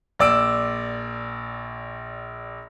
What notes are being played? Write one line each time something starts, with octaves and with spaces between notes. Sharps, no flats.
A#1 D5 E6 D7